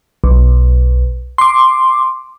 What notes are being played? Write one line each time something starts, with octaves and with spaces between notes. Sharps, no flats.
B1
C6 D6